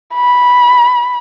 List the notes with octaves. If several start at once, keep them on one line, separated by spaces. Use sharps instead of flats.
B5